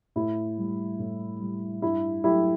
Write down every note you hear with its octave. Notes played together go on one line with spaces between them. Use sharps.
A2 E4
G3
A2
G3
G2 E4
F#3 A3 E4 G4